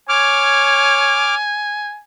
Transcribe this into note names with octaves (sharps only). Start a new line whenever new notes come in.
C#5 G#5 D6 F6